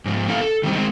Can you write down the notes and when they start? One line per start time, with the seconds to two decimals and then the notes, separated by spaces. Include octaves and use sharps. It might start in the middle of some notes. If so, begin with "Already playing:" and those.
0.05 G#2 F3
0.28 A#3 C#4 E4 A4 F5
0.41 A4
0.63 D#3 G3 C4 D#4
0.77 G#3 C4